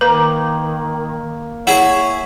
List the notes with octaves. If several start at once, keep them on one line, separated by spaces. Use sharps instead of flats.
D#3 A#3 B4
E4 G#4 C#5 F#5